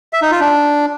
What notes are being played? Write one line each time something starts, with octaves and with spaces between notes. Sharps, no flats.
E5
D#4
F4
D4